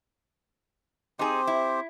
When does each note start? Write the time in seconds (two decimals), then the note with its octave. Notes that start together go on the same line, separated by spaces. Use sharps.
1.19 C4 D#4 G4 G#4 C5
1.47 E4